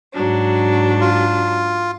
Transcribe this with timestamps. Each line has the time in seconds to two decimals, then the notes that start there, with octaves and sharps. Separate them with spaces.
0.14 G#2 F#3 D4
1.01 F4